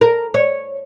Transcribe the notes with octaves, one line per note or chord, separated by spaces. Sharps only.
A#4
C#5